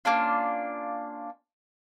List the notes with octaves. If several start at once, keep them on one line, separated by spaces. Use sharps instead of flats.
A#3 C#4 D4 F4